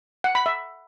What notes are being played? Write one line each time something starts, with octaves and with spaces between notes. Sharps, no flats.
F#5
B5
E5